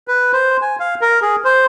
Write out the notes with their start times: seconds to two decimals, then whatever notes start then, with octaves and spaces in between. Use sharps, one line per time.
0.08 B4
0.33 C5
0.62 G#5
0.80 F5
1.01 A#4
1.22 G#4
1.44 C5